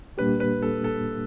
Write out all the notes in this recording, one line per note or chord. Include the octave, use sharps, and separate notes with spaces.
A#2 G3 A#3 D4 G4 B4
B4
A4
A4